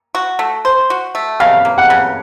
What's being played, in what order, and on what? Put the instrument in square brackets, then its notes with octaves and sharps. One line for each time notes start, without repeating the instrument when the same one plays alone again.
[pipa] F#4
A3
C5
F#4
A3
[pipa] C#3 [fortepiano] F5
[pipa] A#3
[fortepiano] F#5
[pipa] C#3